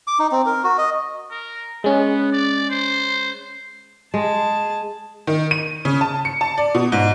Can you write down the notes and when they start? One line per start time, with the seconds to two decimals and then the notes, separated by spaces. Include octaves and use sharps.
0.07 D6
0.19 D#4
0.32 C4
0.46 A#4
0.64 F#4
0.78 D#5
1.31 A#4
1.84 G#3 B3 C#4
2.32 D5
2.70 C5
4.14 G#3 G#4 A5
5.27 D#3
5.51 D#7
5.85 C#3
6.01 A5
6.25 C#7
6.41 A5
6.58 D5
6.75 B2
6.92 G#2